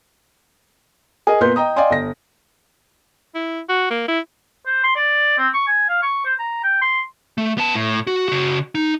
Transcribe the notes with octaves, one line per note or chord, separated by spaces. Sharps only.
G#4 A#4 D#5
A#2 B3 A#4 B4 C6 G6
D#5 G5 A#5 D#6
D5 D#5 F5 G5 G#5 C6
G1 A#6
E4
F#4
A#3
E4
C5
C6
D5
C4
C#6
G#5
F5
C#6
C5
A#5
G5
C6
A3
B3 A5
A2
F#4
C#3 F#4
D#4